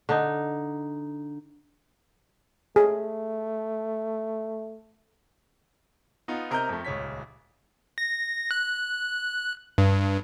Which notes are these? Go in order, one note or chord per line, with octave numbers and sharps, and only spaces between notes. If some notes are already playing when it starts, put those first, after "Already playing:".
D3 D#4
A3 G#4
B3 D#4 F4
C3 A#4 D#5 A#5 F6 G6
F2 A3
D#1 C#2 C#5 B6
A#6
F#6
G2